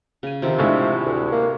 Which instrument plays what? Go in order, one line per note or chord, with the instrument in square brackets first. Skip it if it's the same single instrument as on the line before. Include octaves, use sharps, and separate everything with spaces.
[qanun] C#3 G#5
[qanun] C3 D#3 A4 [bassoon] F3
[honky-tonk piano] A2 D3 G#3 [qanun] E4 F5
[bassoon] D2
A#3